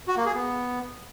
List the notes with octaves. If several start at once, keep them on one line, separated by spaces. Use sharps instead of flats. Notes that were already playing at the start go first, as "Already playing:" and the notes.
F#4
A#3
G#4
B3